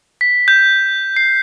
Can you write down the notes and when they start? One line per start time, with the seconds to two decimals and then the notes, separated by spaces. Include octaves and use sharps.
0.21 B6
0.48 G6
1.16 C7